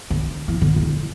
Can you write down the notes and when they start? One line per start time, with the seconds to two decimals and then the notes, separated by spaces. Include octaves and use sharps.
0.10 D3
0.48 E3
0.62 D3
0.76 E2